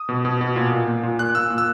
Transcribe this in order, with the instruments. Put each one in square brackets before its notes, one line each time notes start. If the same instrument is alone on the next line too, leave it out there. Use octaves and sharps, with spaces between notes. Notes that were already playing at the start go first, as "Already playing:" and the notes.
Already playing: [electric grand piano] D#6
B2
B2
B2
A#2
A#2
A#2
A#2
A#2 F#6
A#2 E6
A#2
E6